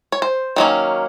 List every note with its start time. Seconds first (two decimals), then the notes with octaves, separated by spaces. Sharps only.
0.12 C#5
0.22 C5
0.56 D#3 F#3 A#3 C#4